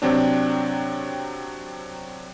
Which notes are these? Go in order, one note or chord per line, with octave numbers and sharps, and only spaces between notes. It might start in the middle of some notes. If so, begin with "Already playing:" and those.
C3 F#3 C4 D4